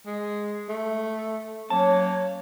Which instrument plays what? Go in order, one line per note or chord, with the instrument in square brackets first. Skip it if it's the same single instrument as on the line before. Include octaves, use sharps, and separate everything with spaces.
[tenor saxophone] G#3
A3
[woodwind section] F#3 A#3 C#5 [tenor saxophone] C#4 [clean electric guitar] A5